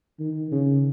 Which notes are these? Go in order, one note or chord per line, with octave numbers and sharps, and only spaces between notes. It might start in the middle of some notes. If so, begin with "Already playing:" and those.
D#3
C#3